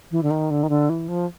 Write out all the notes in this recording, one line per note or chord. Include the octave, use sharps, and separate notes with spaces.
E3
D3
D#3
D3
D#3
D3
E3
F3